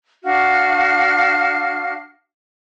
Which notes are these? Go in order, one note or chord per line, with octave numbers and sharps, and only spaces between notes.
D4 F#4 F5 F6